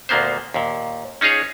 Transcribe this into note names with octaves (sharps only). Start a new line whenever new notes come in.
D2 A#2 A#3 B3 C5
D#2 A#2
C#4 D#4 F4 G#4 C#5